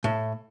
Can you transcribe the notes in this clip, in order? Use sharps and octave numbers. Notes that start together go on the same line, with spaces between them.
A2